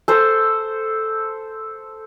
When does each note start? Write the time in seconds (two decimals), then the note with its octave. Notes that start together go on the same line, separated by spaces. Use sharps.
0.08 A4 C5